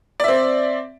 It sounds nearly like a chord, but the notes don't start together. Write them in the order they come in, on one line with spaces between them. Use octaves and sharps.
D5 E5 C4